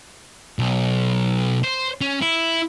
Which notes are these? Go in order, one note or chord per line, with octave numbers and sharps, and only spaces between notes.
B1
C5
C#4
E4